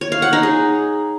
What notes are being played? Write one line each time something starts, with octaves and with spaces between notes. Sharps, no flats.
C#5
F5
F#5
D#4
G#4